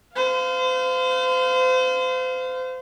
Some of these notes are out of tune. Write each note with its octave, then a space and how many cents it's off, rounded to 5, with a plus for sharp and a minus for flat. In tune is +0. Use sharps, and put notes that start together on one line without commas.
C5 -35 F5 +0